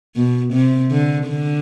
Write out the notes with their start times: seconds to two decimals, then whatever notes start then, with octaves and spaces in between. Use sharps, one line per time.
0.16 B2
0.53 C3
0.91 D3
1.29 D3